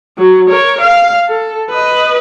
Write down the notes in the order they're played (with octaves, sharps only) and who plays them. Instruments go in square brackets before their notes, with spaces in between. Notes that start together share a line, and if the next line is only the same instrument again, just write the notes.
[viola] F#3
A#4 C#5
F5
A4
B4 D#5